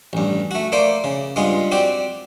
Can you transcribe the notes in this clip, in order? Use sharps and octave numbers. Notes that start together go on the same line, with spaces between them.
A1 G2
A3 F#4
A3 A#3 C5 D5
C#3
G2 G#3 B3 F4
C4 F#4 G4 D5